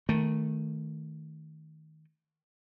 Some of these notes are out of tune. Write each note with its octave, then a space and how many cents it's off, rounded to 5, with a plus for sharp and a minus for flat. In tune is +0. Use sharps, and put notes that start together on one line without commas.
D#3 +10 A3 +0